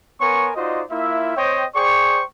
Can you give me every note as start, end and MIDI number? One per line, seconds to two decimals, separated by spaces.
0.21 0.50 59
0.21 0.50 70
0.21 0.50 73
0.21 0.50 80
0.21 0.50 84
0.21 0.50 85
0.57 0.83 63
0.57 0.83 65
0.57 0.83 66
0.57 0.83 72
0.57 0.83 74
0.57 0.83 75
0.91 1.34 58
0.91 1.34 64
0.91 1.34 65
0.91 1.34 76
1.37 1.65 60
1.37 1.65 72
1.37 1.65 73
1.37 1.65 75
1.37 1.65 79
1.76 2.23 68
1.76 2.23 72
1.76 2.23 74
1.76 2.23 79
1.76 2.23 85